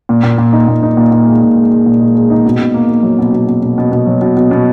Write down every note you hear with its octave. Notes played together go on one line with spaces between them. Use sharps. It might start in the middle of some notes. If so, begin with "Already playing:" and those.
A#2
A#2
A#2
D#4
A#2
D#4
A#2
A#2
G#3
A#2
G#3
G#3
A#2
G#3
G#3
D#4
B2
B2
A#3
A#3
F#3
B2
B2
B2
B2
B2
B2
F#3
B2
B2
B2